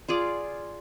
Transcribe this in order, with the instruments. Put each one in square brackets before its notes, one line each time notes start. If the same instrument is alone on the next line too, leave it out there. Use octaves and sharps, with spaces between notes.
[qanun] F4 G#4 D5